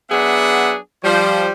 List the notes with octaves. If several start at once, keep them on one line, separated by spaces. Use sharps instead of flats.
F#3 B3 D4 G#4 E5 F#5
F3 G3 C5